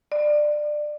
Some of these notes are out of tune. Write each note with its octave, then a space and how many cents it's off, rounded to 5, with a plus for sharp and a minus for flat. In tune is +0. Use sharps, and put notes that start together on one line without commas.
D5 +20